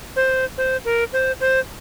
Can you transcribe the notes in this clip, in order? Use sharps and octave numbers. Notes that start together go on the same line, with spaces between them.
C5
C5
A#4
C5
C5